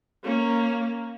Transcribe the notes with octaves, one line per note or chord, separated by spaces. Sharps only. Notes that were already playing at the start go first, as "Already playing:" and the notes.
A#3 C#4